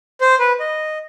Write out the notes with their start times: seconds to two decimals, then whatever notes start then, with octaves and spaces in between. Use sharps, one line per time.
0.21 C5
0.39 B4
0.60 D#5